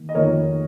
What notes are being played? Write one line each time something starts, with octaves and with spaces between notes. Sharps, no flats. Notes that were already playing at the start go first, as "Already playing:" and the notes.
Already playing: D#3 A#3
D#5
F2 D#3 A#3 A#4 C#5